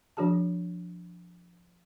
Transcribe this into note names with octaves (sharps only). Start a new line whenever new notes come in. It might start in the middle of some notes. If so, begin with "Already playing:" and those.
F3 D4 F#4 G#4 A5